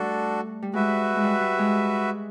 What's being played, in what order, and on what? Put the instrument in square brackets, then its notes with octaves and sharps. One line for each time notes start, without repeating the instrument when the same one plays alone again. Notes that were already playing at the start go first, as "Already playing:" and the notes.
Already playing: [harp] G3 A3 [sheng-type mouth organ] D4 F#4 A4
[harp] G3
[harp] G#3 [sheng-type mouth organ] F#4 B4 E5
[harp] G#3
G3
G3
G#3